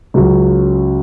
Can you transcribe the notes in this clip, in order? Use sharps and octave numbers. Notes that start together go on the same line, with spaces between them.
C#2 C#3 F#3